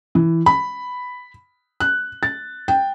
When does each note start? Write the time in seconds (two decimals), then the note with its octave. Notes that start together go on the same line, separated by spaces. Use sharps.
0.15 E3
0.46 B5
1.80 F#6
2.23 A6
2.68 G5